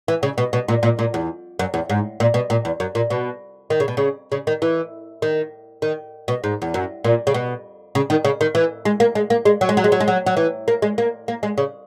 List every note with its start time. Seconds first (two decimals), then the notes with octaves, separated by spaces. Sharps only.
0.08 E3
0.23 C#3
0.38 B2
0.53 B2
0.68 A#2
0.83 A#2
0.99 A#2
1.14 E2
1.59 F#2
1.74 E2
1.89 G#2
2.20 A#2
2.34 B2
2.50 A#2
2.65 E2
2.80 F#2
2.95 A#2
3.10 B2
3.70 D#3
3.80 C#3
3.88 B2
3.97 C#3
4.32 C#3
4.47 D#3
4.62 E3
5.22 D#3
5.82 D#3
6.28 B2
6.44 G#2
6.62 E2
6.74 F#2
7.04 A#2
7.27 C#3
7.34 B2
7.95 C#3
8.10 D#3
8.25 C#3
8.41 D#3
8.55 E3
8.85 G#3
9.00 A#3
9.15 G#3
9.30 A#3
9.45 G#3
9.61 F#3
9.69 G#3
9.77 F#3
9.84 G#3
9.92 F#3
10.00 G#3
10.08 F#3
10.26 F#3
10.37 E3
10.68 A#3
10.82 G#3
10.98 A#3
11.28 A#3
11.43 G#3
11.58 C#3